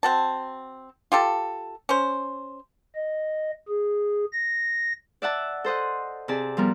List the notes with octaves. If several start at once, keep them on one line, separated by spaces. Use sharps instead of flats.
C4 F#4 A5
F4 G4 A4
C#4 C5
D#5
G#4
A#6
D5 E5 F#5 A5
A4 C5 D#5 F#5
C3 G#4 D5 A5
F3 G3 B3 A#4